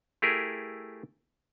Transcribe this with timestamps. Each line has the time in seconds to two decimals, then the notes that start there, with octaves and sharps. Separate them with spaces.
0.22 A3 E4 G4 G#4 A#4